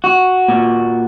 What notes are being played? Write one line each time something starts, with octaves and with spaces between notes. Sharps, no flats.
F#4
A#2